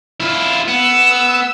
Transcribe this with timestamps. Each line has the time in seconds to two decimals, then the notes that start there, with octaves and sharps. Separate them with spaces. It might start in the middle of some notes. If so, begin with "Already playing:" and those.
0.20 E4 F4
0.68 B3 E6